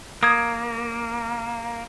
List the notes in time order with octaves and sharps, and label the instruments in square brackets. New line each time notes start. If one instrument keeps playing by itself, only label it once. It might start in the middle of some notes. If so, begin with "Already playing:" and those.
[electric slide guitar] A#3 [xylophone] D#6 G#6